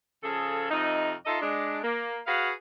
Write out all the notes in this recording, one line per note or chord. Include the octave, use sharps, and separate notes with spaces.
C#3 F3 G#4 A4
F2 C3 D#4
D#4 F4 A4 D#5 E5
G#3 D4
A#3
F#4 G#4 B4 F5